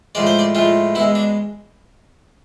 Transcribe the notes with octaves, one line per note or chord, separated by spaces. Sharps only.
A2 F3 G#3 D5
C5
D5
A2 F3 G#3 F4
B2 G#3 E4
D4